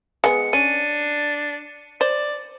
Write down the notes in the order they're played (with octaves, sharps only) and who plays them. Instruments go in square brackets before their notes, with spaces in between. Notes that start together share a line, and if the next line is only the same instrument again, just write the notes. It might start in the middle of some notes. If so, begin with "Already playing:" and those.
[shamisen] G#3 B3 [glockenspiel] C#7
[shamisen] C#4 [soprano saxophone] D4 [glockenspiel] D#7
[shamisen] C5 [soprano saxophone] D5